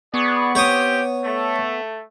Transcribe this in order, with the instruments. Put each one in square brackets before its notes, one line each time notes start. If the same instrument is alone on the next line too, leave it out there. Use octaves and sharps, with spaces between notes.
[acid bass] B3 [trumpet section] G#4 D5 C#6
[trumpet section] C4 G4 [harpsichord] C#5 D#6
[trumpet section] A3